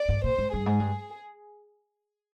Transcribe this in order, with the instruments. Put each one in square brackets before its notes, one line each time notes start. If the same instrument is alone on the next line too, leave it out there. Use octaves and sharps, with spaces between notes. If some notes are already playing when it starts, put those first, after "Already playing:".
Already playing: [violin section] D5
[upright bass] G#2
[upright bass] A#2 [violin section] C5
[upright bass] G#2
[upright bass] G2 [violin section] G#4
[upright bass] G#2
G2